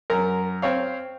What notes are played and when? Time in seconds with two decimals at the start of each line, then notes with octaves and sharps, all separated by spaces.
0.10 F#2 A#4
0.62 C4 C#5 F5